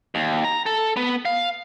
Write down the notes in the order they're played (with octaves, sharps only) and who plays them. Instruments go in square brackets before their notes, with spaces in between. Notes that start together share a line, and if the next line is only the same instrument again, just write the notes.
[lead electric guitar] D#2
A#5
A4
B3
F5